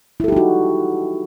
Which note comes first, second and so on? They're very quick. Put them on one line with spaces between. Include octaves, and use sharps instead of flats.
E4 A4 G4 D#4 F#4